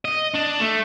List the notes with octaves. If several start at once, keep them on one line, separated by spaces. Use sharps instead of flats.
D#5
D4
A3